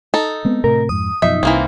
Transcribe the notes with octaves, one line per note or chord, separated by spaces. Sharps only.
D#4 A4
G#3 B3 C4
A2 C3 A3 A#4
F2 G#2 D#6
F#2 B2 F3 D#4 E5
C2 C3 E3 A#3 C4